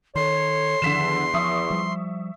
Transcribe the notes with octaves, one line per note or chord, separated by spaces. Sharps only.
D#3 A4 C#5 C6
E2 D3 D#3 F3 B6 E7
F3 E5 C#6 D#6
F3 G3